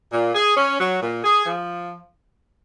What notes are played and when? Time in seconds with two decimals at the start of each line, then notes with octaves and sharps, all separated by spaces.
0.12 A#2
0.34 G#4
0.56 C#4
0.79 F#3
1.01 A#2
1.24 G#4
1.46 F3